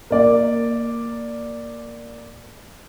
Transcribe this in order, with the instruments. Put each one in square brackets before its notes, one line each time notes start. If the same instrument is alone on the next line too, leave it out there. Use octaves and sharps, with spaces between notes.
[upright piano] A#3 D5